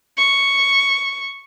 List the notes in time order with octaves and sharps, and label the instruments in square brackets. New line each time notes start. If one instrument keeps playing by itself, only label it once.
[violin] C#6